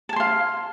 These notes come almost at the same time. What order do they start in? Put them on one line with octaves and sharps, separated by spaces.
A5 G#5 C6 F5